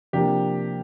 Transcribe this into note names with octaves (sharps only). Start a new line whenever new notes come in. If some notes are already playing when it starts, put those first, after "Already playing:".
C3 F3 A#3 D4 G4